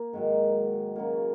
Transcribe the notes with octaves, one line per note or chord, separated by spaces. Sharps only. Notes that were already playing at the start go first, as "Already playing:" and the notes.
Already playing: A#3
G#2 D#3 F#3
C#3 F#3 A#3